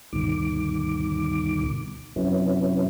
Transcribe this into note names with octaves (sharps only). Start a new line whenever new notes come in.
D2 G2 B2 D#3 D6
F#2 C3 F#3 B3 C#4 E4